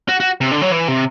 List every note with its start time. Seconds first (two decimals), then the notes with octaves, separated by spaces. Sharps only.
0.09 F#4
0.20 F#4
0.41 C3
0.51 D3
0.61 F#3
0.72 E3
0.88 C3